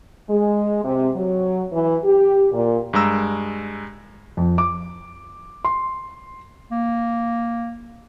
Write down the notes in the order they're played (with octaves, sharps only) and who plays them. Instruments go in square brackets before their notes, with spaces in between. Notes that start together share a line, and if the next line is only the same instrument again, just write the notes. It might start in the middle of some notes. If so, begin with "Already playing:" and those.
[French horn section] G#3
C3
F#3
E3
G4
A#2
[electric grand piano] G2 G#3 A#5 E6
[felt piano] F2
D6
C6
[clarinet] A#3